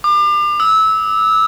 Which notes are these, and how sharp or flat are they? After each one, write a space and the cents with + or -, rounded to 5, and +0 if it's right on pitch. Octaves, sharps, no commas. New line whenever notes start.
D6 +35
E6 -20